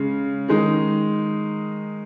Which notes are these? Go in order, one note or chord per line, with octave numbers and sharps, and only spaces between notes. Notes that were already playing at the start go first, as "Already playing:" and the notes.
Already playing: C#3 G#3
D#3 G#3 D#4